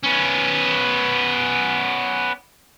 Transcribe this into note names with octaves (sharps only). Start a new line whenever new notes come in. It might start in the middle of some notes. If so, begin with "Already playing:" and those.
B3 C#4